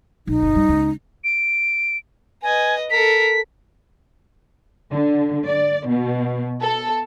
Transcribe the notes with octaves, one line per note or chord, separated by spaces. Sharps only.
A#1 D#4
G1 A#2
G3
C#2
D7
B4 D#5 G#5
A4 A#4 B6
D3
D5
B2
A4